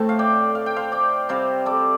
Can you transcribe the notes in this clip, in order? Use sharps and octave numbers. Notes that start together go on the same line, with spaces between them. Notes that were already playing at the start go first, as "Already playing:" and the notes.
Already playing: A2 A3 C4 A5
F5
D5 G5
F5
G5
C5 F5
D5 G5
C3 G3 C4 C5 F5
A4 D5